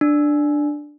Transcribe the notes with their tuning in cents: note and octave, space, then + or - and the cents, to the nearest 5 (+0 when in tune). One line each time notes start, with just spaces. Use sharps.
D4 +5